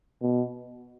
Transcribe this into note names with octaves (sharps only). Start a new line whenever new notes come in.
B2